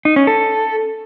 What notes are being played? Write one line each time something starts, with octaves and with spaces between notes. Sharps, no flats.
D#4
C#4
A4